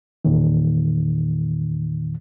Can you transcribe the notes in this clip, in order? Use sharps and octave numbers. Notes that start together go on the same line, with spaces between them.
E2 A#2 D#3